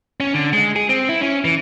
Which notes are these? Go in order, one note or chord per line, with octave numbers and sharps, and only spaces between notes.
C#4
D3
G#3
G#4
C4
E4
C#4
E3